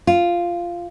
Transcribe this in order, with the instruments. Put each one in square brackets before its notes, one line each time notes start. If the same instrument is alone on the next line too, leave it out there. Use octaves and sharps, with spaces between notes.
[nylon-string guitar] F4